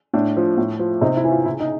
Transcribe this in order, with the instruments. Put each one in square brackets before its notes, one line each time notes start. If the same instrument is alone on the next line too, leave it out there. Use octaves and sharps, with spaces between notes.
[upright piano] A2 D4
F3
A2
F3
C3 D#4
E4
E3
F4
C#3 E4
D#4